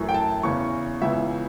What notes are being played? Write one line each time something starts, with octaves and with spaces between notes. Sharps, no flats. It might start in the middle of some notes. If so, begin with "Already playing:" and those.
Already playing: F#2 E3 A3
G5
A5
E2 C#3 E3 C#6
C#2 C#3 E3 B3 E5